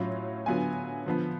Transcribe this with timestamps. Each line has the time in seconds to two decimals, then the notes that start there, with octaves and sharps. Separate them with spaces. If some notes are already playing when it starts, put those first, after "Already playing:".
Already playing: A2 F#3 C#4 F4
0.46 D3 F#3 B3 F4 G#5
1.06 D3 F3 B3